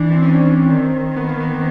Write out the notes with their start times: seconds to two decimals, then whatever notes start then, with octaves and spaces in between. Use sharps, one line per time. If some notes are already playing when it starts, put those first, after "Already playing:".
Already playing: E3 D4
0.11 C4
0.22 C#4
0.69 D#3 C4
1.16 B3
1.29 A#3
1.40 B3